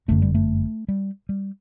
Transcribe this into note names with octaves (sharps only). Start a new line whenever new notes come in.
G1 F#2 D3 A3
G3
A3
G3
G3